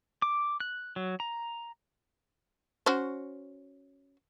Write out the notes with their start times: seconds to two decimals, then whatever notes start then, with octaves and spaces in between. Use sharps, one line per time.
0.22 D6
0.60 F#6
0.96 F#3
1.20 A#5
2.86 C#4 F#4 C5